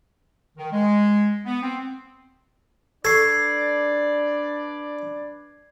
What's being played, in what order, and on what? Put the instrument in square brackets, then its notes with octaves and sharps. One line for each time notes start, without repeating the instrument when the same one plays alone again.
[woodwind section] D#3
G#3
B3
C4
[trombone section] D4 [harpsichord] A4 C#6 [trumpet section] B4 D5 [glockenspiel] G#6 C7